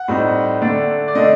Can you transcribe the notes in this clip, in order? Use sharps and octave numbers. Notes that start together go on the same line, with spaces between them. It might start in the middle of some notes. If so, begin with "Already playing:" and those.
Already playing: F#5
A2 G3 C4 D#4
D3 A3 D4
D5
D3 A3 D4 D#5